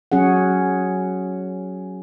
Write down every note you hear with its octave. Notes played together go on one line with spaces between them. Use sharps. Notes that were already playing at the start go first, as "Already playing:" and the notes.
F#3 C#4 G#4 F#5